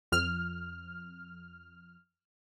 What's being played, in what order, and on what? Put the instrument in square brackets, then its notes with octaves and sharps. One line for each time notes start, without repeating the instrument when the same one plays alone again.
[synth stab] F2 F6